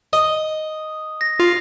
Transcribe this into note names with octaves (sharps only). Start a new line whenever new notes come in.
D#5 D#6
A#6
F4